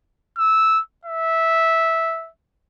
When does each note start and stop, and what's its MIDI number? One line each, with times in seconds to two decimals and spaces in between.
0.38 0.81 88
1.05 2.30 76